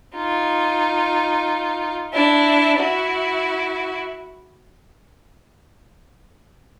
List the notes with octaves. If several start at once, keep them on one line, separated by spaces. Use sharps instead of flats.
D#4 F4
D4 E4
E4 F#4